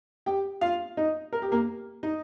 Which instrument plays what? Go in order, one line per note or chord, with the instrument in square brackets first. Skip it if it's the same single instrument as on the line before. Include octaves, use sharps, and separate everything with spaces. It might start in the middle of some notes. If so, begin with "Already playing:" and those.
[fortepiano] G4 G5
F4 F5
D#4 D#5
A#4
G4
A#3 A#4
D#4 D#5